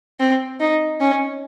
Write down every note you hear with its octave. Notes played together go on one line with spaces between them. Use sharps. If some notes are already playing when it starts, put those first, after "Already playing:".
C4
D#4
C#4